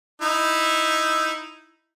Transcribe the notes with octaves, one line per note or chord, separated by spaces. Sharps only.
D#4 E4